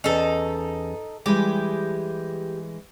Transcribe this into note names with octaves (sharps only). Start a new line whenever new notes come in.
E2 C#4 D#4 A4
E3 G3 G#3 G4